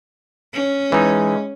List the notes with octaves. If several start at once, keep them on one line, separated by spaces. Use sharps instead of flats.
C#4
E3 G#3 D#4